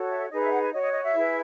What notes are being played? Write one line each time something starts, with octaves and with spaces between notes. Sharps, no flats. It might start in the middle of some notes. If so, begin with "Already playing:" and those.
Already playing: F#4 A4 C#5
E5
D#4 G#4 B4 D#5
E5
F#5
G#5
F#4 C#5 D#5
D#5
D#5
E5
E4 G#4 B4